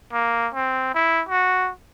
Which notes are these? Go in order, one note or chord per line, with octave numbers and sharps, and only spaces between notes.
A#3
C4
E4
F#4